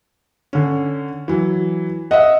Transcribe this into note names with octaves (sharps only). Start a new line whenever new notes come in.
D3 C#4
E3 F#3
D#5 E5 F#5